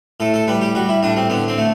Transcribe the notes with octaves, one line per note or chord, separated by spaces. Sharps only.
A2 A4
A4
G3 B4
G4
G3 F#4
E4
A2 D4
C4
D3 B3
C4
A3